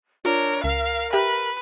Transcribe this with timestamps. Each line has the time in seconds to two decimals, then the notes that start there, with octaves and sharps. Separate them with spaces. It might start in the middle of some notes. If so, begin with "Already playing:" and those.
0.25 D4 F4 A#4 C#5 D5
0.64 C#2 A#4 F5
1.13 G4 B4 E5 G5